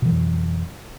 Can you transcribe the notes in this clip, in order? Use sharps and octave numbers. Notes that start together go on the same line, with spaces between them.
F2 B2 E3 F#3